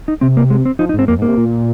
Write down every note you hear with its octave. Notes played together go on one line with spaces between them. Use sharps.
D#4
C3 C4
A#3
G#3
C4
F3 D#4
D#4
G#2
C4
F2 A#3
G#2
A#3
C3
A#2